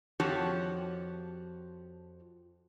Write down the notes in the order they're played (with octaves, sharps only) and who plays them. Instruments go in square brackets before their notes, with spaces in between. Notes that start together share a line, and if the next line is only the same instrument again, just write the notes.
[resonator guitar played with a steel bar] F2 F3 F#4 G4 C#5 A5